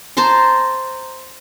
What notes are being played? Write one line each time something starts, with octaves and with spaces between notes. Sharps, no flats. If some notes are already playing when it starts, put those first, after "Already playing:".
C5 A5 A#5 C6